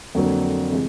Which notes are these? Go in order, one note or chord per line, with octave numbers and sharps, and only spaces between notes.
F2 D3 F#3 A#3
C3 E3 G#3